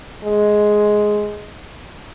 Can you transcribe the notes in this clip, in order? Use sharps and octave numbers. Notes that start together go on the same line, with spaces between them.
G#3